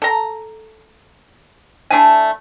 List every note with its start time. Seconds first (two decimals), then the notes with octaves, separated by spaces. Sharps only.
0.02 A4 A#5
1.90 A3 D4 E4 G#5